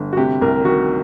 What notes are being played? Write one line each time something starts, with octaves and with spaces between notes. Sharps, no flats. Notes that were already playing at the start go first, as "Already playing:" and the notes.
Already playing: G1
F#4
C3 G4
C2 A#4
D#3 F#4